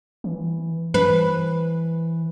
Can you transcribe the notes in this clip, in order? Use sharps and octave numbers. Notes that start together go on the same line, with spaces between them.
E3
E3 B4